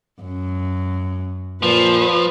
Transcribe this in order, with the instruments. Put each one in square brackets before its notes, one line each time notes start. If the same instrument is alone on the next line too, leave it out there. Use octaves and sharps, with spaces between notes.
[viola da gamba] F#2
[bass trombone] A#2 [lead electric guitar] F3 [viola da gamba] B4